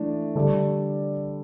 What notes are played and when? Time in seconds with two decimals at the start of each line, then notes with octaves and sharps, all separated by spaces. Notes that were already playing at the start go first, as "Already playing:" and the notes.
Already playing: E3 A3 D4
0.35 D3 G3 D4 A4 D5